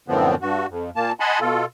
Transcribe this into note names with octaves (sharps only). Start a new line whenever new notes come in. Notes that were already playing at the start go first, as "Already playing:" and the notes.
F#2 A2 D3 F3 B3 C4
G2 F#4
F2
A#2 A#3 A5
D#5 F#5 G#5 A5 B5 C6
B2 F4 A4